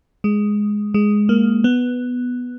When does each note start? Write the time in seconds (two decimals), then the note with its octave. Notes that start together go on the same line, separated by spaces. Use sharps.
0.24 G#3
0.94 G#3
1.29 A#3
1.64 B3